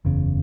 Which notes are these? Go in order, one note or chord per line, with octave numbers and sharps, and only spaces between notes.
F#1 E2 C#3